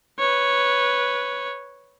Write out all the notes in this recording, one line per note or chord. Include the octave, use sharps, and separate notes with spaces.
B4 C#5